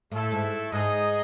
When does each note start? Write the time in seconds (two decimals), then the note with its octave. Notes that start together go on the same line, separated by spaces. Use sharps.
0.11 A2 A3 E4 A4
0.32 G#2
0.72 G#2 D#4 G#4 D#5